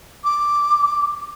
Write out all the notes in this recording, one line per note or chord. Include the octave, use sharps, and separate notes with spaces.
D6